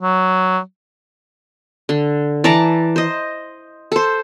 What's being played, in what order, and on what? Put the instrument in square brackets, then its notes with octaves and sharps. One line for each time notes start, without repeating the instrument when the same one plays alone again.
[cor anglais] F#3
[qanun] D3
E3 D5 A5 A#5
C5 D#5
A4 C5